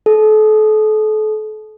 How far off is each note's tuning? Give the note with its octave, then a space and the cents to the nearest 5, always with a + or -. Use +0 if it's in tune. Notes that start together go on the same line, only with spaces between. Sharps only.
A4 -35